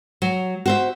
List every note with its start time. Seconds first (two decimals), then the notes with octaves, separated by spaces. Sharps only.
0.22 F#3
0.66 F#4 C5 E5